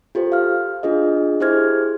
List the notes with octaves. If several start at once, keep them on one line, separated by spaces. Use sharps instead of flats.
F4 G4 A4 C5
F5 F6
D4 F4 G#4 D#5
E4 G4 G#4 C5 F6 G#6